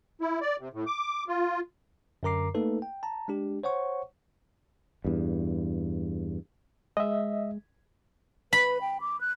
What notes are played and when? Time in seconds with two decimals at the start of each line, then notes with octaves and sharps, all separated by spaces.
0.21 E4
0.41 D5
0.60 C3
0.73 A2
0.87 D6
1.28 F4
2.23 F#2 D3 A#4 A#5 D6 C7
2.54 A3 A#3 D#4 A4 B4
2.82 G5
3.03 A5 A#5
3.28 G#3 D4 G4
3.63 C5 C#5 F#5 C#6
5.05 E2 G2
6.97 G#3 D#5 E5
8.53 B4 B5
8.81 G5
9.01 D6
9.21 F#6